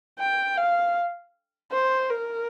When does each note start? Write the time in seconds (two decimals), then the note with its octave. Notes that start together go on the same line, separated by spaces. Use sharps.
0.19 G5
0.57 F5
1.72 C5
2.10 A#4